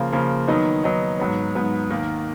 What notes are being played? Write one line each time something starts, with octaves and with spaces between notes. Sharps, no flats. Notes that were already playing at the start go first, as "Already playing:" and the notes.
Already playing: C#3 F3 A#3
C#3 F3 A#3
D#3 F#3 B3 D#4
D#3 F#3 B3 D#4
G#2 F#3 B3
G#2 F#3 B3
D#2 D#3 A#3